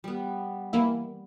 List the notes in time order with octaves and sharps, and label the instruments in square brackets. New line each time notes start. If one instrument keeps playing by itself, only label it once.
[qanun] G3 B3
[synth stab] E3 A#3 E4